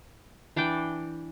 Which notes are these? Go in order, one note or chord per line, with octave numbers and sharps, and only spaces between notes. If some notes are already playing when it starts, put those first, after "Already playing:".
E3 D4 D5 G5